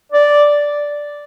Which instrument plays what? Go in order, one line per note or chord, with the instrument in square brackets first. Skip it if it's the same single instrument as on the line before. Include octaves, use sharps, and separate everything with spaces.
[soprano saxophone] D5